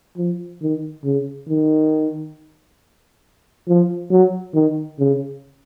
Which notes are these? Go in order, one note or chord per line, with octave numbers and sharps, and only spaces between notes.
F3
D#3
C#3
D#3
F3
F#3
D#3
C#3